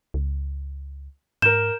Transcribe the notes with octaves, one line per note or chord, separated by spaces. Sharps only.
C#2
G#2 A#4 G6 E7